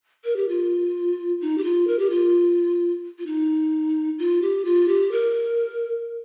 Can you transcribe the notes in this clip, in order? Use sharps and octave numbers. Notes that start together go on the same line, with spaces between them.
A#4
G4
F4
D#4
G4
F4
A#4
G4
F4
F4
D#4
F4
G4
F4
G4
A#4